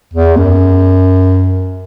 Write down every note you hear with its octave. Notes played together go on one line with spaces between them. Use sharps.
E2
F#2